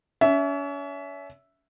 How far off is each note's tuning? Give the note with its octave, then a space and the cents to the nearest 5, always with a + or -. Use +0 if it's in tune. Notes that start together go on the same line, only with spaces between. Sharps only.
C#4 +35 E5 +0